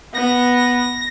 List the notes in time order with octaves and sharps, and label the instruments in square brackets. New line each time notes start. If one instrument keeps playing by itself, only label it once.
[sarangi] B3 [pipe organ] A#6